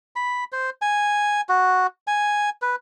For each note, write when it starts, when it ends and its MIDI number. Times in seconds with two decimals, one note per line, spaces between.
0.16 0.44 83
0.52 0.70 72
0.82 1.41 80
1.49 1.87 66
2.07 2.50 80
2.62 2.76 71